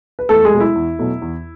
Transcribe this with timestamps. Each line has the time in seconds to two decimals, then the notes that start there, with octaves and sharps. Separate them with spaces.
0.19 B4
0.29 E2 A3 A4
0.44 G#3 G#4
0.52 B2 F#3 A3
0.60 E4
0.75 E2
0.99 B2 F#3 A3
1.22 E2